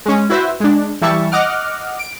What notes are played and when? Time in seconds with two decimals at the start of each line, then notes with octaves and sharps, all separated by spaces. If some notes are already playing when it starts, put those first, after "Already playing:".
0.06 G#3 C#4
0.30 E4 F#4 B4 C5 E5
0.60 G#3 D4
1.02 E3 G3 E4 E5 A5 C#6
1.32 D#5 F#5 D6 F6
1.99 D7